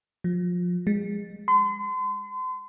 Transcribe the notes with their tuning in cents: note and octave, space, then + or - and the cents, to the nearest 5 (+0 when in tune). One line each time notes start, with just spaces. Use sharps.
F3 +25
G#3 -25
C6 -40